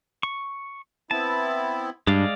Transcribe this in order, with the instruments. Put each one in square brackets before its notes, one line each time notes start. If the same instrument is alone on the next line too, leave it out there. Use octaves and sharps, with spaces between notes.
[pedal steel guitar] C#6
[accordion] B3 C4 E4 [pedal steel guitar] A5
[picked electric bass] G2 [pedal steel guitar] G#3 D5 F5